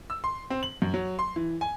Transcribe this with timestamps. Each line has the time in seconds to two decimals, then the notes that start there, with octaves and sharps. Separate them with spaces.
0.10 E6
0.24 C6
0.50 C4
0.63 F#7
0.82 F#2
0.94 F#3
1.19 C6
1.36 E3
1.61 G#5